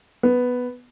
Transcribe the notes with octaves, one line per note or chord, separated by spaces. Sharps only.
B3